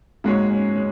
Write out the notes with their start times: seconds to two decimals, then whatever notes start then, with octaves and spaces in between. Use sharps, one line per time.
0.24 G#2 G#3 A#3 F#4 C#5
0.49 C#4
0.74 G#3 C#4